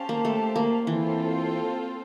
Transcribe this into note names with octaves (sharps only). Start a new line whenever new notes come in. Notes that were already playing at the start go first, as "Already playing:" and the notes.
Already playing: C#4 G4 C5 F5 A5
A#3
A3
A#3
E3 C4 F4 A4 C5